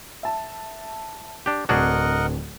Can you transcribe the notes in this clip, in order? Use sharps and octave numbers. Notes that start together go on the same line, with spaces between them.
E5 A5
D4 G4
D1 C4 D4 F#4 G#4 A#4 D#5 F#5